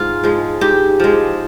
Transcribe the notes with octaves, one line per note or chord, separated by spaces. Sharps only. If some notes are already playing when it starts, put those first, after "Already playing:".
Already playing: G#2 F4
F3 G#3
G#2 G4
F3 G#3